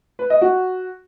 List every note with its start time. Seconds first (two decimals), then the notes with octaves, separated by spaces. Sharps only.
0.19 B4
0.30 D#5
0.41 F#4